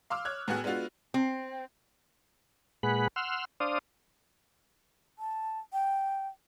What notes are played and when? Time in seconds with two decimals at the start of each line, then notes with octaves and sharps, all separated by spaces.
0.10 F5 C6 D6 E6 F6
0.25 C#5 D6 F#6 G#6
0.48 A2 B3 F#4 G#4 F#5 F#6
0.64 G#3 B3 D4 F4 F#4
1.14 C4
2.83 A#2 G#3 G#4 B4 F#5 B5
3.16 F#5 C6 E6 F6
3.60 D4 C5 D5 F5 D#6
5.19 A5
5.73 G5